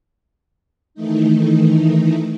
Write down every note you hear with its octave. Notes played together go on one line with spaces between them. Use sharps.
D#3 E3 A3 D#4